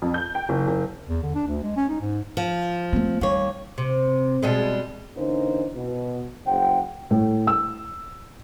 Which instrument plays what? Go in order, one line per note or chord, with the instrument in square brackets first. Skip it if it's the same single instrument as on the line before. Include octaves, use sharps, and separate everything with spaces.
[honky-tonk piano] F2
G6
G5
F#1
F#1
[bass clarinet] E2
D3
D4
D2
G#3
C#4
D#4
G#2
[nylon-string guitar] F3
[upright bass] A3 C4
[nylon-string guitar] D#2 C#5 [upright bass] G3
[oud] C3
B2 G3 G#3
[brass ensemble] D3 E3 A#3 C#4 D#4 C5
B2
F#1 G#4 C5 F#5 G5
[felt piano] A2
E6